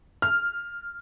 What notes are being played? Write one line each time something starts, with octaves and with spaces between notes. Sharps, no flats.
F6